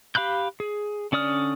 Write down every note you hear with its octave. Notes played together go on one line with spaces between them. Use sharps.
G4 F5 B5 F#6 G6
G#4
D3 C#4 D5 D#6 F6